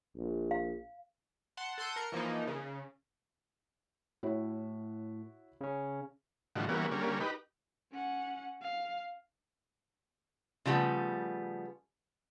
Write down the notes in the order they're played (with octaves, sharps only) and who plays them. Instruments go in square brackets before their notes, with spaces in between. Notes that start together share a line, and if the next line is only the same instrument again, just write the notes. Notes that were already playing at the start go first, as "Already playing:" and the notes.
[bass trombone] A#1
[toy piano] F5
[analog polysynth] F#5 A5 C6
A4 F#5 C6 G6 D#7
A#4 C#7
E3 F3 A#3 D#4
C#3
[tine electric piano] A2 [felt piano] E4 F#4 C#5
[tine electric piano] C#3 C#4
[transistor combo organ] A2 D3 D#3 F3 G3 F#4
E3 G3 A#3 B3 C#4 F#4
D3 G3 A#3 C#4
D#4 G4 B4
[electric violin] C#4 F#5
F5
[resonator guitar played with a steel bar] C#3 F3 G3 A3 B3